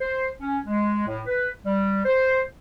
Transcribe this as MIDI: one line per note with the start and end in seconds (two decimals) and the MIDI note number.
0.01 0.28 72
0.40 0.59 61
0.66 1.03 56
1.06 1.21 45
1.26 1.50 71
1.66 2.01 55
2.05 2.41 72